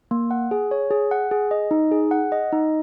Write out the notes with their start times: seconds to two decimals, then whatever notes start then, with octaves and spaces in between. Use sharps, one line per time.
0.11 A#3
0.31 F#5
0.51 G#4
0.71 C#5
0.91 G#4
1.11 F#5
1.31 G#4
1.51 D#5
1.71 D#4
1.92 G#4
2.11 F#5
2.32 D#5
2.52 D#4